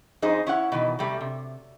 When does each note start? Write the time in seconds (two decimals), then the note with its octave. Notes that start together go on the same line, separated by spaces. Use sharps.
0.22 F2 D#4 G#4 C5
0.47 C#4 E4 F#5
0.72 B2 D#3 E3
0.99 C3 G3 A3
1.21 C3